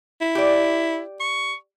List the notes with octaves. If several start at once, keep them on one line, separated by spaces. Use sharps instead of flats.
E4
G4 D5
C#6